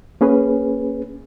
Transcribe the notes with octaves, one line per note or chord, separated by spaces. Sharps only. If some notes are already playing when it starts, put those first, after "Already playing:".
A#3 C#4 G#4 B4